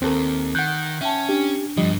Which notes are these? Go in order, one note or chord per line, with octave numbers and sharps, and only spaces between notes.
D#2 C4 A4 A#4
D#3 F#5 F#6 G6
C#4 E5 G5 A5
D4 G4
G2 D3 F3 G3 D#5